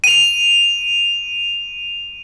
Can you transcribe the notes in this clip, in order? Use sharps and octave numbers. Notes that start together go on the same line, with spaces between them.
D#7 F7